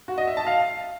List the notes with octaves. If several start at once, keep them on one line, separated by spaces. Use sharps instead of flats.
F#4
D#5
E5
A5
F5